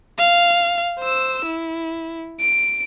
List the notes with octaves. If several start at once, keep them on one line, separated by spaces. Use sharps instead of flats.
F5
C5 E6
E4
D7